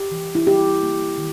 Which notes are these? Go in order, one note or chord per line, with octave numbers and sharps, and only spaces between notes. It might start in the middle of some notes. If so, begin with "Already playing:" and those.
Already playing: G4
E3
E4
A#3 G4
A#3
D#3